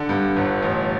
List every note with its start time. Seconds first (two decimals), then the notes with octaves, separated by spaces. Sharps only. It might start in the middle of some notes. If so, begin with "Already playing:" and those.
Already playing: D3
0.09 G2
0.36 G1
0.62 A1